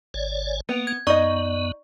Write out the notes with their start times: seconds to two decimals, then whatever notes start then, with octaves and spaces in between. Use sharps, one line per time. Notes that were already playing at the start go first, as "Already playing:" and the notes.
0.14 G#1 C#5 D5
0.69 A#3 B3
0.87 G#6
1.07 F#2 B3 D#4 D5 D#5 C#6